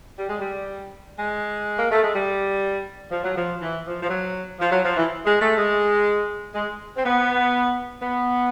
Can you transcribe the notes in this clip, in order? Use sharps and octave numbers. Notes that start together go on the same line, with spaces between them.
G3
G#3
G3
G#3
A#3
A3
G#3
G3
F3
F#3
F3
E3
F3
F3
F#3
F3
F#3
F3
E3
G#3
A3
G#3
G#3
C4
B3
B3